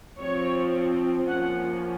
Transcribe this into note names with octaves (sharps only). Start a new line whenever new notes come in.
F3 C4 C#5
F3 A#3 C#4 F#5